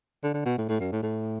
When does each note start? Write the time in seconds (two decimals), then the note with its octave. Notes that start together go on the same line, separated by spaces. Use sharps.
0.24 D3
0.34 D3
0.46 B2
0.58 A2
0.69 A2
0.80 F#2
0.92 A2
1.03 A2